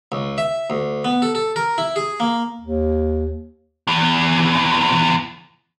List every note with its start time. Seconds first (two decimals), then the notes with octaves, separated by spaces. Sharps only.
0.12 C#2
0.38 E5
0.70 D2
1.05 B3
1.22 A4
1.35 A4
1.56 A#4
1.78 E4
1.96 G#4
2.20 A#3
2.61 D#2
3.87 E2 E3